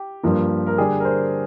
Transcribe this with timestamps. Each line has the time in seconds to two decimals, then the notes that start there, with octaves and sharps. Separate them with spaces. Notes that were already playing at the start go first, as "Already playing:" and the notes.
Already playing: G4
0.23 G2 F3 A#3
0.67 A#4
0.78 D3 G3 D4 G#4
1.00 A#4
1.05 C5